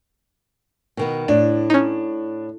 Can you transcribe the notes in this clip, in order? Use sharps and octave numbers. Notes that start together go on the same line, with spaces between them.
B2 D#3 B3
A2 D4
C#4 D#4